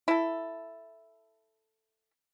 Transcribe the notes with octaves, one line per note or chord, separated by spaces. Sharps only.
E4 A4